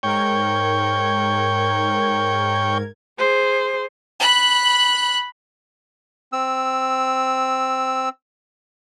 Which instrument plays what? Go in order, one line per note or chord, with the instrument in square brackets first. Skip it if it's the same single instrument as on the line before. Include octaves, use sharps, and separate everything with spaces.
[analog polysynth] G#2 A#4 G#6 [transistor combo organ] C#5 G5
[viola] G#4 C5
[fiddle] B5 F#6
[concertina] C4 E6